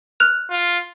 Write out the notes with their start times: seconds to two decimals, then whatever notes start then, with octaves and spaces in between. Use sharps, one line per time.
0.20 F6 F#6 F7
0.51 F4